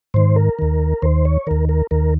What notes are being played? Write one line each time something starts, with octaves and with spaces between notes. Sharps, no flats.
G#2 D#3 C5
A#4
D#2 D#3
D#2 D#3 C5
C#5
D#2 D#3 A#4
A#4
D#2 D#3 A#4